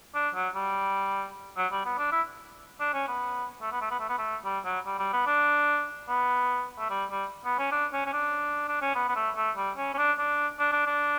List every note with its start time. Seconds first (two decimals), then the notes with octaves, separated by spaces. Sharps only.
0.15 D4
0.34 F#3
0.55 G3
1.57 F#3
1.72 G3
1.85 B3
1.98 D4
2.12 E4
2.80 D4
2.94 C#4
3.08 B3
3.62 A3
3.72 B3
3.81 A3
3.91 B3
3.99 A3
4.09 B3
4.18 A3
4.45 G3
4.65 F#3
4.86 G3
4.99 G3
5.13 B3
5.26 D4
6.08 B3
6.79 A3
6.90 G3
7.10 G3
7.45 B3
7.59 C#4
7.71 D4
7.93 C#4
8.06 C#4
8.13 D4
8.68 D4
8.82 C#4
8.95 B3
9.08 B3
9.15 A3
9.36 A3
9.57 G3
9.77 C#4
9.94 C#4
9.98 D4
10.18 D4
10.59 D4
10.72 D4
10.86 D4